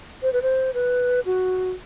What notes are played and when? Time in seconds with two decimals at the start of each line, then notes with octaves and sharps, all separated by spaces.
0.22 C5
0.33 B4
0.42 C5
0.74 B4
1.25 F#4